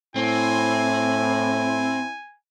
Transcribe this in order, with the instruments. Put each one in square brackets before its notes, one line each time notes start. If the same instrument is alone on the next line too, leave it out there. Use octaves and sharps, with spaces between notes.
[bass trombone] A2 [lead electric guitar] C4 [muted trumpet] E4 [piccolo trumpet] G#5